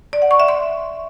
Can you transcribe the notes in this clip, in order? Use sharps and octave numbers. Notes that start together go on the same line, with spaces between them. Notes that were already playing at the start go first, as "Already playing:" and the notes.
D5
F#5
C#6
E5
C6